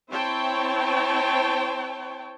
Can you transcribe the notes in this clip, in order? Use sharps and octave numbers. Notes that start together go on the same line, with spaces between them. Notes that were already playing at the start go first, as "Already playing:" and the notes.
C4 E4 C5 C#5 G5 A5